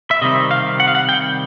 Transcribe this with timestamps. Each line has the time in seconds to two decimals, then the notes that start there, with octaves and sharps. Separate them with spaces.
0.11 E5
0.21 C3 D#3 G3 C4 D#5
0.51 F5
0.80 F#5
0.88 F5
0.95 F#5
1.09 G5